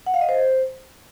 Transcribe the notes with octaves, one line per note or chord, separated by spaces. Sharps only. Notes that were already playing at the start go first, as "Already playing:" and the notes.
F#5
F5
D#5
C5